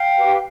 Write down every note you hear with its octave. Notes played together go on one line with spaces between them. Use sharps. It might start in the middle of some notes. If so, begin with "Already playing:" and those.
Already playing: F5 G5
G4 B4